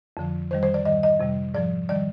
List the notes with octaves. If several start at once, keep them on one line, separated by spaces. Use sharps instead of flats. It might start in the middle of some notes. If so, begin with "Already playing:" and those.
F2 D3 F3
F2 D#3 G3 C5
C5
D5
G#2 D#3 G3 D#5
D#5
F2 C3 G3
G#2 F3 D5
D#3 G3 D5